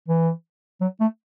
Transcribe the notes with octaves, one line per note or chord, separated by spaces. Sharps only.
E3
F#3
A3